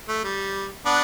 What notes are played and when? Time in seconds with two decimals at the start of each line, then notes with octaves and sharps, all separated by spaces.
0.08 A3
0.24 G3
0.85 B3 D4